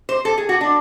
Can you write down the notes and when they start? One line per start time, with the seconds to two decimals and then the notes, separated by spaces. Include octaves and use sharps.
0.09 C5
0.25 A4
0.38 G#4
0.49 F#4
0.61 D4